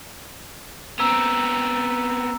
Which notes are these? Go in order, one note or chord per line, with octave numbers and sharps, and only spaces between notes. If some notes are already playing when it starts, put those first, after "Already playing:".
B3 C4 A#5 E6 G#6